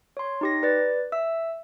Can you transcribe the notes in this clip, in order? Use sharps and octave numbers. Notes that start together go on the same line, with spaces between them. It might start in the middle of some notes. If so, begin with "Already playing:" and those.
C#5 C6
D#4 G4 A#6
B4 D5 A6
E5 E6